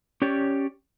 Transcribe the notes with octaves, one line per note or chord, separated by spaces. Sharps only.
C#4 G4 C#5 D5